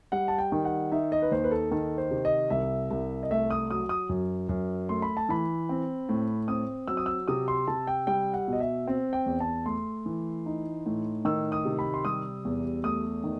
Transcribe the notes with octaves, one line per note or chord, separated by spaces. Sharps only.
G3 F#5
A5
G5
D#3
F#5
D#4 E5
D#5
B4
D#2 C5
B4
A4
D#3 A4
C5
C3
D#5
C2 E5
C2
D#5
A3 E5
D#6
F#3 D#6
D#6
F#2
F#2
A3 C6
B5
A5
E3 B5
C4
A2
C4 D#6
F#3 E6
D#6
E6
C3 D#6
C6
C3 A5
G5
G3 G5
F#5
B2
D#5
E5
C4
G5
E2
A5
A3 C6
E3
D#4
A2
D#3 E6
D#6
C3
B5
C6
G3 D#6
E2
A3 D#6
D#3